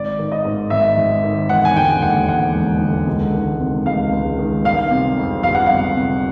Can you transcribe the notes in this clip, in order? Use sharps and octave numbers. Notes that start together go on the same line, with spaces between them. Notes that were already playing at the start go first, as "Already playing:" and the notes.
Already playing: G#1 D5
D#3
D#5
G#2
G#1 E5
G#1
D#3
E1 F#5
G#5
D3 G5
D#2 F#5
E1 F#5
E1
D3
C#2
D#3
C3
C#2 F5
C#2
D#3
G1 F5
C3
F2
G1 F5
F#5
G1 F5
C3